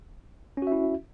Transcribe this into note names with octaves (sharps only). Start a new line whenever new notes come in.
C#4 E4 F#4 E5